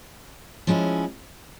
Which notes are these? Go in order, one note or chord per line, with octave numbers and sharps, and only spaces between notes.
F3 G#3 C#4 E4